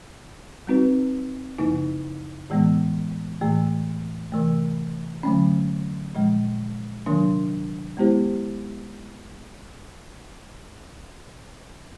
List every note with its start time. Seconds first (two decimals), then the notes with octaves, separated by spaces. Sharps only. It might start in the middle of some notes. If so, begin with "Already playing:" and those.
0.67 G3 C4 D#4 F#4 B4
1.58 F#2 C#3 F3 A#3 D#4
2.50 A2 E3 G#3 B3
3.41 A2 E3 A3
4.32 C3 E3 A3
5.23 D3 F#3 A3 C#4
6.15 A#2 F3 G#3
7.06 C3 D#3 F#3 A#3 D4
7.97 G#3 B3 E4 G4 C5